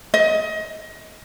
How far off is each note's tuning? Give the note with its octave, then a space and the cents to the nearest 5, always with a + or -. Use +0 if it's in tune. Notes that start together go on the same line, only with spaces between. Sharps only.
D#5 +25